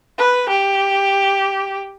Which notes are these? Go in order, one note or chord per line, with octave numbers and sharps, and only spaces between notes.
B4
G4